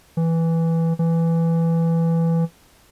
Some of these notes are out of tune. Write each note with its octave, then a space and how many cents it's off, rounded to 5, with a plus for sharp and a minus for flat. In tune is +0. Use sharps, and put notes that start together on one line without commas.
E3 +0
E3 +10